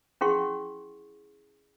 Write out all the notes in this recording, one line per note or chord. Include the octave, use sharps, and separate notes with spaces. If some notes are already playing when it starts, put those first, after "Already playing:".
C#4 E4 G#4 F#5 C6 C#6